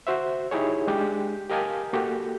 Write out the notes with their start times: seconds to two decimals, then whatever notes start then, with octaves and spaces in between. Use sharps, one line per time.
0.07 F#4 C5 E5
0.51 D#4 E4 G4 G#4 C#5
0.88 G#3 D4 G4
1.50 G4 A#4 D#5 F5 G#5 A5
1.93 A#3 F#4 G4 A4